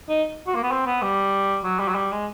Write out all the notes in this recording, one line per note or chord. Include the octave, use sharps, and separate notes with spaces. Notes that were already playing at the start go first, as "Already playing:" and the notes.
D#4
F#4
A#3
B3
C4
B3
G3
F#3
G3
F#3
G3
G#3